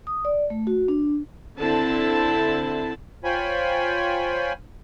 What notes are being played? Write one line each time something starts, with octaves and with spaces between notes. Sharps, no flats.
D#6
D5
A3
F#4
D4
D3 C4 E4 A5
F4 C5 C#5 G5 G#5 B5